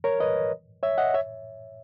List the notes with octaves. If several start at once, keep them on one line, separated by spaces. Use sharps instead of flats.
A#4 C#5
B4 D#5
C#5 E5
D#5 F#5
C#5 E5